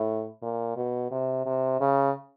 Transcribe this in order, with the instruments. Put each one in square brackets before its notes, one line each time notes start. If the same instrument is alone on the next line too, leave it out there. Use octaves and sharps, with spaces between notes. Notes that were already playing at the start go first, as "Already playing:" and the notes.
Already playing: [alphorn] A2
A#2
B2
C3
C3
C#3